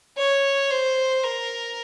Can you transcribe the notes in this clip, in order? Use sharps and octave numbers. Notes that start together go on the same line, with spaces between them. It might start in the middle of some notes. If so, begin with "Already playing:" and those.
C#5
C5
A#4